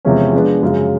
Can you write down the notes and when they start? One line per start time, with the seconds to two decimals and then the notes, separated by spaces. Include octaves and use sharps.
0.05 E2 C3 F3 G#3 C#4
0.33 F3 G#3 B3 D4
0.62 F#2 C#3 F3 G#3